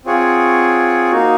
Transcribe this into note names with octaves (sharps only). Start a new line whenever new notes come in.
C4 F4 G#4 C#5 F#5
A#3 D#4 F#4